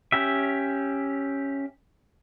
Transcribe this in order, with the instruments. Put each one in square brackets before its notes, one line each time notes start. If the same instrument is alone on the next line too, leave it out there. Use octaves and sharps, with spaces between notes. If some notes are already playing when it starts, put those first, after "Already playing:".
[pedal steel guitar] C#4 G4 E5